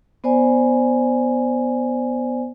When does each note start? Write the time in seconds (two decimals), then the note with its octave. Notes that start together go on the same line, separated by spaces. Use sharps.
0.24 B3 C5 D5 G#5